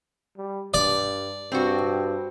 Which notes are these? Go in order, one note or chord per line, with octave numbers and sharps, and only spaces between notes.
G3
G2 D5
G2 C4 F#4